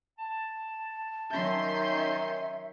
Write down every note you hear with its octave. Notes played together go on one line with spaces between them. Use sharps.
A5
D#3 F#3 C#4 E5 C6 G6